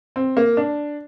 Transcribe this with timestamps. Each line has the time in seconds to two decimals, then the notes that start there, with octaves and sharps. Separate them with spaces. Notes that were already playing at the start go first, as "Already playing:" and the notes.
0.16 C4
0.37 A#3
0.57 D4